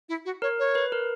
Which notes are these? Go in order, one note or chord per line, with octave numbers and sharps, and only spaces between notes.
E4
F#4
A#4 C#5
C#5
B4
A#4